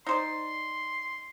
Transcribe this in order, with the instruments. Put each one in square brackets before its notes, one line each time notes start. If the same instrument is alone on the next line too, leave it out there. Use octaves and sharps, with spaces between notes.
[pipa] D#4 C5 D5 [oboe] C6